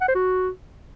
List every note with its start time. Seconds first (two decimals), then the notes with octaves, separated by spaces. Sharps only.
0.01 F#5
0.08 C5
0.15 F#4